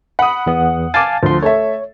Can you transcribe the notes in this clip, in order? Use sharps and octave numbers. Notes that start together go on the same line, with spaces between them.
F#5 B5 D#6
E2 B3
F5 G#5 A5 D6 A6
D2 F3 C6
A3 A4 C#5 E5